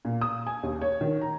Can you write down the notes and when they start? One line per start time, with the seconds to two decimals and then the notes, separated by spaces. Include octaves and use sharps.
0.05 A#2
0.21 D#6
0.47 G#5
0.63 D#2
0.81 C#5
1.01 D#3
1.21 A#5